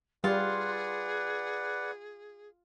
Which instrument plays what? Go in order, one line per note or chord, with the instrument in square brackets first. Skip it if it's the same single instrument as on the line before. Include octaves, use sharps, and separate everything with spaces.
[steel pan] G3 [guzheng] F4 [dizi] G#4 [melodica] B4 D5 F#5